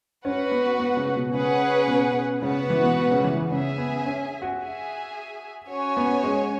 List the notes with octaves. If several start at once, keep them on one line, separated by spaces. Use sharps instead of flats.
C#4 F#4 B4 F#5
B3
B3
C#3
B2
C#3 C#4 G#4 B4 F#5
B2
C#3 B3 F#4 B4 F#5
E3
B2
B2
C#3
E3
C#3
C#3 G#4 E5 G#5
B3
C#4
F#4
G#4 E5 G#5
C#4 F#4 C#5 G#5
B3
G#3